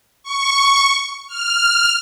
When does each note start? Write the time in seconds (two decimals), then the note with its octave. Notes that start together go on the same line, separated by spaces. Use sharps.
0.23 C#6
1.27 F6